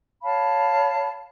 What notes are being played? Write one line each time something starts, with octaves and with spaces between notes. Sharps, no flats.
C#5 F5 A5 B5